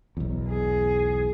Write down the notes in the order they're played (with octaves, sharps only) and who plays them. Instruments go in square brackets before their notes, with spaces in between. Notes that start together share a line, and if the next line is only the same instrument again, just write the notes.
[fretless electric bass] B1 E2
[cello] G#4